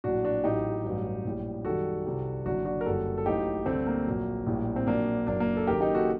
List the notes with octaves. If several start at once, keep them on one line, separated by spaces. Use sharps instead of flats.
A#1 A2 F#3 D4 F#4
D4 F#4
A1 A2 F#3 D#4 G4
A1 G2 F#3
A#1 A2 G3
F#2 D#3 G3 F#4 A4
C2 C3 G3
F#1 F#2 D3 D4 F#4
D4 F#4
A#4
F#1 F#2 D3 G3 F#4 A4
A4
A1 A2 F#3 D#4 G4
D2 D3 G3 A3 C4
A#3
A#1 A#2 F#3
A#1 A2 G3
C4
A#1 A#2 F#3 A#3 D4
F#1 F#2 F#3 A#3 D4
A#3
A4
F#1 F#2 D#3 G4 A#4
D#4 G4
F#4 A4